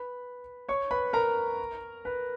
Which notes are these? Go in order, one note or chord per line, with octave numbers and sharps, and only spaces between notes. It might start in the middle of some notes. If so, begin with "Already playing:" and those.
Already playing: B4 B5
C#5 C#6
B4 B5
A#4 A#5
B4